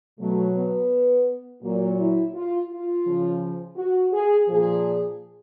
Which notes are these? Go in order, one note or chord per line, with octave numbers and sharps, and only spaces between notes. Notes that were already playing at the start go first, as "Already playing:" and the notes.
B2 F#3 A3
B3
A#2 F#3 A#3
E4
F4
F4
C#3 F3
F#4
G#4
A#2 F3 G#4